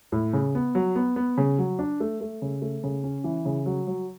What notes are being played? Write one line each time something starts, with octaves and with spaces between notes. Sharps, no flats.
A2
C#3
B3
F#3
B3
B3
C#3
F#3
D4
A3
A3
C#3
A3
C#3
C#4
E3
C#3
F#3
F#3